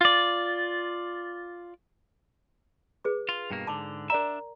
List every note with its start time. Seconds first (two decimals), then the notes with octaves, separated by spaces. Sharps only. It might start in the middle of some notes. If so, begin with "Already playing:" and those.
0.01 F4 D5
3.04 G#4 B4 D6
3.29 F4
3.51 G2 B2 A#3
3.67 G#2 D3 A5 D6
4.10 D4 A#4 D5 E5 A#5